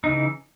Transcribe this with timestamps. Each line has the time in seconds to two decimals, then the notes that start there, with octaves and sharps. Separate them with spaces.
0.04 D#4
0.07 C#3
0.09 E3